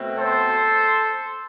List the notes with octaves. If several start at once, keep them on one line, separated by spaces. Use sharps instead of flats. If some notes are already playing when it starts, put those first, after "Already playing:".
Already playing: B2 A3 C4
A4 C5